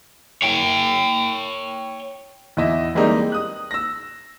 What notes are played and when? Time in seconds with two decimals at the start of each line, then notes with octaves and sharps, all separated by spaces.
0.42 C#5 G5
2.57 E2 E4 D#5 E5
2.95 E3 G3 G#3 A#3 C4 D#4
3.32 D#6 F#6
3.71 E6 A#6